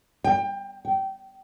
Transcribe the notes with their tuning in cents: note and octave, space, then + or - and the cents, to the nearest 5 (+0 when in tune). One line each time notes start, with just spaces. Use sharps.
G5 +25
G5 -20